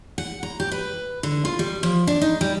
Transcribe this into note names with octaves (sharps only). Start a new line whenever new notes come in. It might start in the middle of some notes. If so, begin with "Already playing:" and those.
F#5
A#5
G4
B4
D3
F4
G3
F3
D4
D#4
G3